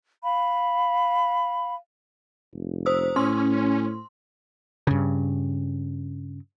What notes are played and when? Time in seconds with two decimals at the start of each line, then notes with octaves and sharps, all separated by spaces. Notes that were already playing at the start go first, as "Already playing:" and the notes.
0.24 F5 B5
2.53 F1
2.86 C5 D#6 E6
3.16 A2 C#4 C6
4.87 G2 C#3